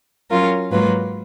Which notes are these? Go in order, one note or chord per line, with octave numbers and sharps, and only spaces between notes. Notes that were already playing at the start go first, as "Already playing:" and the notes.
F#3 C#4 F4 A#4
G#2 F#3 A#3 F4 B4